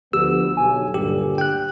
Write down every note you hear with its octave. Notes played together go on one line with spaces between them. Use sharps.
D2 F3 B3 G4 E6
B1 G#5
D2 G2 A#2 D3 G4
G5 F#6